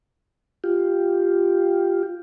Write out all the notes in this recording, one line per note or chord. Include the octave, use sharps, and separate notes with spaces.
F4 G4